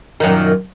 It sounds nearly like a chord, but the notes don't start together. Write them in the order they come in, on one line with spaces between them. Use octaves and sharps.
D#3 F#2 A#2